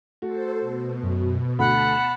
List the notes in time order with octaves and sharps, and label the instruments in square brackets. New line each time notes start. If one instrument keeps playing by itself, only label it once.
[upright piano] A3 F#4 [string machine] A4 C5
[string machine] B2
[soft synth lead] F#2
[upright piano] D2 A3 [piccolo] F#5 [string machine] A5 [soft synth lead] B5